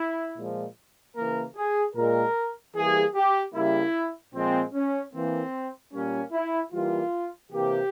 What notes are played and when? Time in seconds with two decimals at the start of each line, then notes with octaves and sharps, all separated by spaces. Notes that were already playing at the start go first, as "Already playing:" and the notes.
Already playing: E4
0.37 A#2 F3 G#3
1.16 C#3 E3 A#3 A#4
1.56 G#4
1.96 A#2 G#3 A#4
2.76 E3 G3 A#3 G#4
3.15 G4
3.55 C#3 G3 A#3 E4
4.34 A#2 F3 G#3 C4
4.74 C#4
5.14 E3 A#3 C4
5.93 A#2 G3 A#3 C#4
6.33 E4
6.72 E3 G3 A#3 F4
7.51 C3 E3 A#3 G4